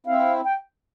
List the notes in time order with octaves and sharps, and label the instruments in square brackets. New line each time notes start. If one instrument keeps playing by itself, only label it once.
[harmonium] C4 E4 [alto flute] F5
[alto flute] G5